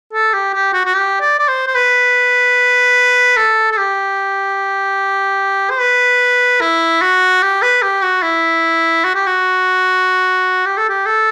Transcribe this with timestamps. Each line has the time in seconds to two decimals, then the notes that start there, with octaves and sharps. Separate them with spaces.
0.13 A4
0.33 G4
0.54 G4
0.73 F#4
0.85 F#4
0.94 G4
1.20 D5
1.39 D5
1.48 C5
1.67 C5
1.75 B4
3.37 A4
3.72 A4
3.77 G4
5.70 C5
5.80 B4
6.61 E4
7.02 F#4
7.42 G4
7.62 B4
7.82 G4
8.02 F#4
8.22 E4
9.04 F#4
9.15 G4
9.27 F#4
10.66 G4
10.77 A4
10.89 G4
11.06 A4